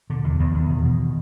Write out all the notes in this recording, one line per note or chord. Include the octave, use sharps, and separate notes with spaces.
B2 D3
E2
E2 D#3
E2
B2
B2